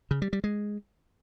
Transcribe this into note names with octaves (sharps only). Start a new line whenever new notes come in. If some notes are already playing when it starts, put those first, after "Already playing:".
C#3
G3
G3
G#3